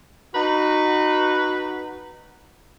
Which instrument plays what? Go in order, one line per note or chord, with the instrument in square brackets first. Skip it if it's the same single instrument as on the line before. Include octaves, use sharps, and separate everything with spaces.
[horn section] D#4 F#4 B4